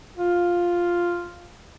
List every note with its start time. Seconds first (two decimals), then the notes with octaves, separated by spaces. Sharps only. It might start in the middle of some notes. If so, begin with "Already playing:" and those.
0.17 F4